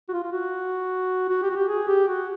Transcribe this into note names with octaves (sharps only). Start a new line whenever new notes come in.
F#4
F4
F4
F#4
F#4
G4
F#4
G4
G#4
G4
F#4